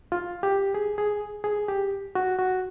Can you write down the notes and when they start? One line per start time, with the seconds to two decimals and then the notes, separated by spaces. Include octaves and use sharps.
0.12 F4
0.43 G4
0.74 G#4
0.98 G#4
1.44 G#4
1.68 G4
2.15 F#4
2.39 F#4